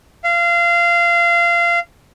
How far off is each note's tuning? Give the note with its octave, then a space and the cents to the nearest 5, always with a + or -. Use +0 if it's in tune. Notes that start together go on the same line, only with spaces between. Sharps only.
F5 -25